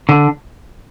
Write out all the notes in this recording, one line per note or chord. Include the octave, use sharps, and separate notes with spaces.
D3